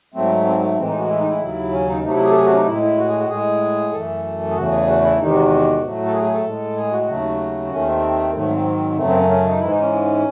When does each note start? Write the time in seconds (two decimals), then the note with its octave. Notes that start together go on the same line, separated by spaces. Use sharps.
0.14 G#2 F#3 A3 C4
0.45 C4
0.62 A3
0.77 A2 E3 G#3 C4
0.88 D#4
0.99 F#4
1.09 E4
1.19 D#4
1.29 E4
1.40 D#2 C#3 F#3
1.72 C#4
1.88 D#4
2.04 C3 F#3 A3 D#4
2.14 E4
2.24 G#4
2.31 A4
2.35 G#4
2.45 F#4
2.52 C#4
2.56 D#4
2.66 A2 G#3 E4
2.82 E4
2.98 F#4
3.08 G#4
3.19 F#4
3.29 A2 G#3 G#4
3.92 F#2 E3 A3 A4
4.51 G#4
4.56 E2 C#3 E3 A3 F#4
4.71 G#4
4.87 F#4
5.03 E4
5.19 E2 C3 D#3 G#3 D#4
5.34 F#4
5.81 A2 F#3 A3
6.06 A4
6.13 G#4
6.24 G#4
6.34 A4
6.45 A2 G#3
6.76 G#4
6.92 F#4
7.08 D#2 C#3 F#3 A3
7.71 D#2 D#3 A3 C#4
7.87 C4
8.34 G#2 D#3 F#3 A3
8.50 C4
8.97 F#2 C#3 F#3 A3 C4
9.08 C4
9.18 C#4
9.29 C#4
9.44 D#4
9.60 G#2 E3 G#3 E4
9.71 D#4
9.81 C#4